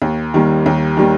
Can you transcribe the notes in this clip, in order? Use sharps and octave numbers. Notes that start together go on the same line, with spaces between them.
D#2
D#3 G3 A#3
D#2
D#3 G3 A#3